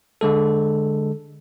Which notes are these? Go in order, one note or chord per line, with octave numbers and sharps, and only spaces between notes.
D3 G#3 A4